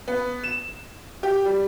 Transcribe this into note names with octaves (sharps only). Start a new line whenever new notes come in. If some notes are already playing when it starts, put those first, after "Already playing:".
B3
E7
G4
G3